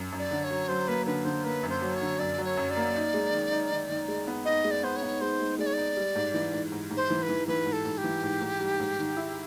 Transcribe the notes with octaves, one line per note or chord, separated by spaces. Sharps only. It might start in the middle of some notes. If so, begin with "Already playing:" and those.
Already playing: F#2
F#2
D5
D3
C#5
F#3
F#3 C5
A#3 B4
D3 B4
D3 C5
A#3 B4
F#2
C5
F#3
C#5
D3
F#2 D5
F#3
C#5
F#2
D5
A#3
D#4
G#3
D#3
D#4
D#3
D#3
G#3
B3
D#4 D#5
G#3
D5
B3 C5
C#5
B3
G#3 C5
G#3
G#3 D5
C#5
D#4 D5
G3
G#2
E3
G#2
G#2
G#2
C5
E3
B4
E3
E3 B4
G#2
A4
G#2
G4
E3
G#2
G#2
G3
G#2
D#3
E4